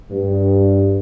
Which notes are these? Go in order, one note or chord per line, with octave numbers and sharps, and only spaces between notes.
G2